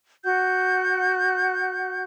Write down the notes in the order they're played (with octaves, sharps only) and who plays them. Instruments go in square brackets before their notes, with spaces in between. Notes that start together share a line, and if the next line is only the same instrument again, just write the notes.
[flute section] F#4 F#5 G6